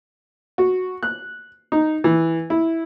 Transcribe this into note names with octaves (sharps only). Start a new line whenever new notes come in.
F#4
F#6
D#4
E3
E4